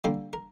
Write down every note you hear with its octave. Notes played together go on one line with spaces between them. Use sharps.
D3 G3 A#3 C5
A#4